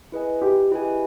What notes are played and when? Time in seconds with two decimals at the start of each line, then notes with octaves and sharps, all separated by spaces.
0.12 E4 G#4 B4 D#5 G#5
0.42 G4
0.71 E4 G4 G#4 B4 D#5 G#5